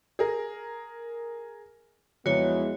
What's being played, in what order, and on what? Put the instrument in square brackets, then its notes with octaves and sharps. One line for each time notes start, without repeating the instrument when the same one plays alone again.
[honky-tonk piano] G#4 A#4
[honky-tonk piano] F2 F#3 [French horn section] G#3 B3 E4 [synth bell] F#4 C#5